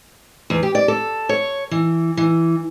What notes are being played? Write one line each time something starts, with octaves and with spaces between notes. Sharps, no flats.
E2
G4
D5
A4
C#5
E3
E3